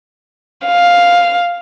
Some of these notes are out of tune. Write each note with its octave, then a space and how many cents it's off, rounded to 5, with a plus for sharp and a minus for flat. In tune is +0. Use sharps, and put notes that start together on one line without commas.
F5 +5